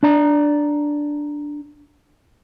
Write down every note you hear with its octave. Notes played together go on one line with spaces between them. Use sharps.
D4 D5 A#5